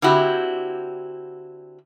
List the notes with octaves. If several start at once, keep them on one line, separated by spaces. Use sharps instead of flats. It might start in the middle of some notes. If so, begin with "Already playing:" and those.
D3 C4 E4 F#4 G4